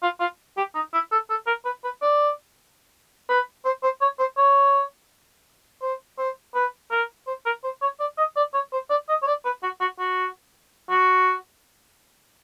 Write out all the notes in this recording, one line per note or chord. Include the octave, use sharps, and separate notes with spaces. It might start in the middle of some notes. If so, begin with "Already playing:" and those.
F4
F4
G4
D#4
E4
A4
A4
A#4
B4
B4
D5
B4
C5
C5
C#5
C5
C#5
C5
C5
B4
A#4
C5
A#4
C5
C#5
D5
D#5
D5
C#5
C5
D5
D#5
C#5
D5
B4
F#4
F#4
F#4
F#4